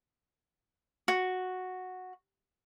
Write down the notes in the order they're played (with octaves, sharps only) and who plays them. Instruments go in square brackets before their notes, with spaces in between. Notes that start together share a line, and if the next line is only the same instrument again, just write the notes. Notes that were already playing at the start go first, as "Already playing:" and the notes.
[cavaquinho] F#4